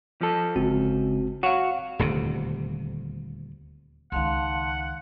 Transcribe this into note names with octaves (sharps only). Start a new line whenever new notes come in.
F3 A4
G1 C#2 C4 F#4
F#4 C#5 F5 F#5
D#1 D2 C3
C#2 D#3 F5 F#5 A5 C6